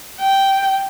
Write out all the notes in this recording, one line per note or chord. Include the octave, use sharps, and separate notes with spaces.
G5